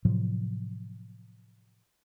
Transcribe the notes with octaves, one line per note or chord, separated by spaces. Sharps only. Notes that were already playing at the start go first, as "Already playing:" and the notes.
A2 C3 F3 F#3